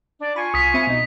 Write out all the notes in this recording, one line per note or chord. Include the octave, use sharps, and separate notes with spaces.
D4 D5
F4 G#5 B5 C#6
C2 D#6 B6
C4 E5 B5
B2 D#4